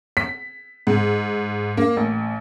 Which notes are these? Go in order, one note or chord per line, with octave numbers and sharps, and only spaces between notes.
B6
G#2
A#3
A1